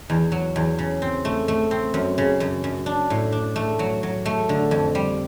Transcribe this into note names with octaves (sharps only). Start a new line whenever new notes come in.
E2
F#3
E2
C#3
C4
A3
A3
C4
F#2
C#3
F#2
F#2
D4
A2
D4
A3
F#3
F#3
A3
D3
F2
G3